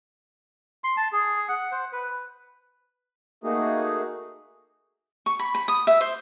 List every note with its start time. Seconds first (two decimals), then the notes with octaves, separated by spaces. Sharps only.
0.84 C6
0.97 A5
1.12 G#4
1.49 F#5
1.72 C5
1.93 B4
3.44 A3 A#3 D#4 F#4 G#4
5.26 C#6
5.39 B5
5.55 B5
5.68 D#6
5.87 E5
6.01 C5